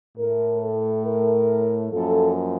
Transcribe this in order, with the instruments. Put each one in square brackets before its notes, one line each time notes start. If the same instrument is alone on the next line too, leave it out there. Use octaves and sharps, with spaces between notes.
[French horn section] A2 A3 A#4
A4
A#4
F#2 F3 A#3 A4